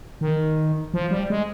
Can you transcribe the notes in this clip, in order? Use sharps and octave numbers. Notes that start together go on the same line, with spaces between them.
D#3
F3
G3
G#3